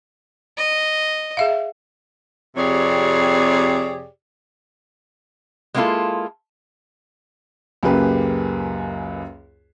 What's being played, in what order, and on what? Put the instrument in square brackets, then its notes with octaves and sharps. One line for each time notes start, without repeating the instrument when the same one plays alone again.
[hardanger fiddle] D#5
[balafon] G#4 E5 F5
[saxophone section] F2 C3 G4 G#4 C#5 D5
[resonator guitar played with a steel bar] G#3 A#3 B3 E4 F4 A4
[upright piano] C#2 F#2 A#3 G4 G#4 B4